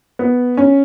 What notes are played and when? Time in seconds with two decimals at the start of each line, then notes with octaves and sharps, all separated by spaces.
0.19 B3
0.57 C#4